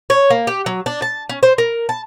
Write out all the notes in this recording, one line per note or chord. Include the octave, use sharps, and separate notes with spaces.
C#5
A#3
G4
F#3
D4
A5
C#4
C5
A#4
A5